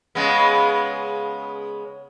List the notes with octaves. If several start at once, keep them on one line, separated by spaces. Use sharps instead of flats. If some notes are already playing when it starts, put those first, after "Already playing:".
C#3 G#3 B3